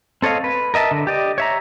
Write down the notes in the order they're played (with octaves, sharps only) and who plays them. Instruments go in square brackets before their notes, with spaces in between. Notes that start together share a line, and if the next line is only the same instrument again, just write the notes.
[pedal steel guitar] C4 A4 C#5 D#5 F5
B4
A#4 D#5 E5 A5
D3
G4 D5 D#5
C#5 E5 A#5